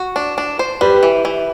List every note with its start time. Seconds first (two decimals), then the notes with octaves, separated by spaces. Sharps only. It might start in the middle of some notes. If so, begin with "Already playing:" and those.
Already playing: F#4
0.16 D4
0.38 D4
0.59 C5
0.81 G3 G4 B4
1.03 E3
1.25 E3